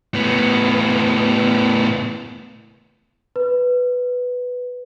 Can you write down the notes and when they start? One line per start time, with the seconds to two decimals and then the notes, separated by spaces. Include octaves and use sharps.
0.14 A2 B3
3.36 B4